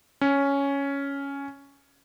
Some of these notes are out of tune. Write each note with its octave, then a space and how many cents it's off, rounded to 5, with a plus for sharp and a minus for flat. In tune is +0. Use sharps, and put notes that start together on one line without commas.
C#4 +5